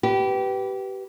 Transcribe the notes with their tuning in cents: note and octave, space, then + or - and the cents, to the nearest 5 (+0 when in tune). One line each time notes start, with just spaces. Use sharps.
G4 -25 B4 +0